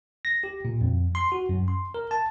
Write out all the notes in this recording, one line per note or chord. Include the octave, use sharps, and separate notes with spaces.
A#6
G4
A#2
F2
C6
F#4
F#2
C6
A#4
A5